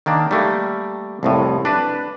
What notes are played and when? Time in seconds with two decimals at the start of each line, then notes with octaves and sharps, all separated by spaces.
0.06 D#3 A#3 D4
0.31 G3 A3 A#3
1.23 C2 F2 A2
1.65 D4 B4